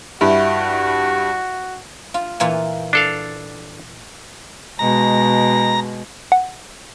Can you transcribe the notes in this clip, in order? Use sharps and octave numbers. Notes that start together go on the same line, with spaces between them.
G2 E4 F#4
F4
A#2 E3 F4
D4 A4 F5
B2 G#3 A#5
F#5